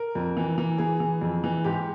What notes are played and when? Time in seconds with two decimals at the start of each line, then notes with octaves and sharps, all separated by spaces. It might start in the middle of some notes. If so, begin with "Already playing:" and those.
Already playing: A#4
0.15 F2
0.37 E3
0.58 E3
0.78 E3 G#4
1.00 E3
1.21 F2
1.44 E3
1.64 G#2 G4